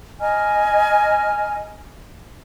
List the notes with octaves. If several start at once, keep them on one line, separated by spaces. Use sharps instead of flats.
D#5 G#5 A#5 F6